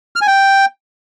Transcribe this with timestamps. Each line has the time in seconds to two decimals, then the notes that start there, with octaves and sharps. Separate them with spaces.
0.16 F6
0.21 G#5
0.27 G5